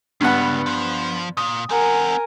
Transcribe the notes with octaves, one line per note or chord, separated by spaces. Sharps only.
C#2 G2 B3 F#5
F3
A#2 D#6
C4 A#4 F#5 G#5